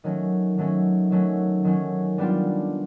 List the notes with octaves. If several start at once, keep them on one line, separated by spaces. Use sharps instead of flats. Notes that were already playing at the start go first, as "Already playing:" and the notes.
D#3 F#3 A3 C#4
D#3 F#3 A3 C#4
D#3 F#3 A3 C#4
D#3 F#3 A3 C#4
G3 B3 D4 F4